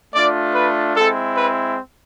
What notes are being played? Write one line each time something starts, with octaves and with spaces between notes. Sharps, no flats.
A3 D4 F4 D5
B4
G#3 C4 E4 A4
B4